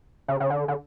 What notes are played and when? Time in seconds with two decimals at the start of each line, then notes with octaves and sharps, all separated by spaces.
0.28 C#3
0.40 C#3
0.50 D3
0.68 D3